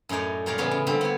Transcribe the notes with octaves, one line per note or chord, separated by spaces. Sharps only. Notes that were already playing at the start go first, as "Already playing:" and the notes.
F#2 A2 D#4 C#5 D5
A#2 G3 A#4 C#5 D5
E2 A2 C#3 B3 F4 C#5
C#3
D3 G3 A#3 C4
B3 C#5